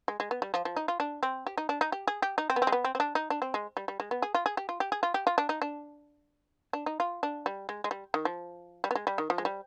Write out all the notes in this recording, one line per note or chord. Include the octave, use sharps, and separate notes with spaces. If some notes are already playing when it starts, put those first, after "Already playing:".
G#3
G#3
B3
G3
F3
F3
D#4
F4
D4
C4
G4
D#4
D4
D#4
G4
G#4
G4
D#4
C4
B3
C4
G#3
B3
C4
C4
D4
D#4
D4
C4
G#3
G3
G3
G#3
B3
G#4
F4
G#4
G4
F4
G4
G#4
F4
G4
F4
D4
D#4
D4
D4
D#4
F4
D4
G3
G#3
G#3
G3
D#3
F3
G3
B3
G#3
G3
D#3
F3
G#3
G3